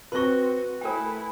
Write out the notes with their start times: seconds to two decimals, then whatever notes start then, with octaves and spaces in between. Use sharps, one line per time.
0.12 C4 F#4 B4 C6 C#6 A#6
0.81 A3 E4 A#4 G5 G#5